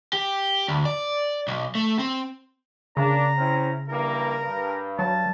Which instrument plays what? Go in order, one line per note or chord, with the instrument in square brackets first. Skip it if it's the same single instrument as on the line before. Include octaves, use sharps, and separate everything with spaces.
[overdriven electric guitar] G4
D2
D5
B1
A3
C4
[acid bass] C#3 [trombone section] A#3 D4 [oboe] A#5
[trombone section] C4 C#4 E4
[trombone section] G2 E3 A#3 [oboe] A#4
[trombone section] G2
[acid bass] F#3 [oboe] A5